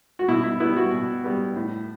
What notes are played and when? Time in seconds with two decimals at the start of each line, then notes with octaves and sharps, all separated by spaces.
0.19 F#4
0.28 B2 E4
0.44 E4
0.60 G3 B3 E4
0.76 F#4
0.92 B2
1.24 G3 B3
1.56 A2